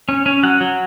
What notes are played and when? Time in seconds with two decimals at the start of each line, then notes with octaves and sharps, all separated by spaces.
0.09 C#4
0.26 C#4
0.43 F#3 F#5
0.61 F#3